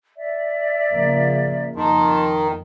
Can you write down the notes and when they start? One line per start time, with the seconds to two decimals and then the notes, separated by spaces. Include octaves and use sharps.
0.16 D5 E5
0.93 C#3 F3 A#3
1.76 F2 D#3 A5 C6